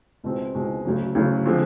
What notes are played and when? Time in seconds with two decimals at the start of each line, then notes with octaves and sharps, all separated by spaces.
0.24 C#2 B2 G#3 C4
0.54 C#2 B2 G#3 C4
0.85 D2 C#3 F#3
1.15 D2 C#3 F#3
1.46 D3 F3 G#3 C4